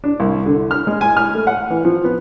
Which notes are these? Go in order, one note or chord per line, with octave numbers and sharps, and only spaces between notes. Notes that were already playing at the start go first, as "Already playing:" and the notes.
D4
C2
D3
F6
G#3
G#5
F6
A3
F#5
E3
F3
B3